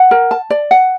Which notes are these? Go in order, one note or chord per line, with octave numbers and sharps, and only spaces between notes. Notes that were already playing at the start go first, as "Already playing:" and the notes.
Already playing: F#5
A#4
A5
D5
F#5